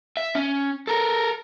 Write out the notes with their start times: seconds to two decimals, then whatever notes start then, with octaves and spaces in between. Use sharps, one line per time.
0.17 E5
0.35 C#4
0.87 A4 A#4